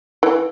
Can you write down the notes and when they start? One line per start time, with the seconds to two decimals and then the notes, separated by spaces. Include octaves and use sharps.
0.23 E3